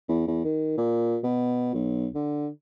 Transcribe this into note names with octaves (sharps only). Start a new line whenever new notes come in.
E2
E2
D#3
A#2
B2
B1
D3